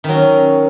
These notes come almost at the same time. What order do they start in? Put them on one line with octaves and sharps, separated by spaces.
D#3 F#3 C#4